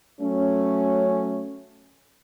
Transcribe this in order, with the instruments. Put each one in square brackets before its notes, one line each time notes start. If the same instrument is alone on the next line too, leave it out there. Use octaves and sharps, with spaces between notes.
[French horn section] F#3 A3 C#4